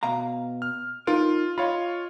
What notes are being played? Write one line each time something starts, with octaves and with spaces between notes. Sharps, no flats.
B2 F5 A#5
F6
D#4 F4 A#4
F4 C#5 D#5 F5 B5